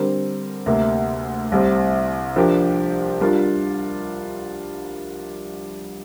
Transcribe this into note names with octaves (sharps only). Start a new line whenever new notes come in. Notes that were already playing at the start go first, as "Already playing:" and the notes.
Already playing: D3 G3 C4 A#4
D2 C3 A#3
C2 C3 G3 C4
F3 D4 G4 A#4
G3 D4 F4 A#4